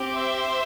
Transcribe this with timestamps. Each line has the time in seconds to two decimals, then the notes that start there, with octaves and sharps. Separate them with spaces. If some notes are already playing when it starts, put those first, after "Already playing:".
Already playing: C4 G4
0.15 C5 E5